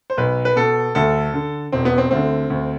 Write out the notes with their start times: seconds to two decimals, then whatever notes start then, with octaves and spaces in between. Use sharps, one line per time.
0.10 C5
0.17 B1 B4
0.45 B4
0.56 B2 A4
0.95 D2 A4
1.34 D3
1.72 E1 C4
1.85 B3
1.98 C4
2.11 D2 D3 C4
2.50 D2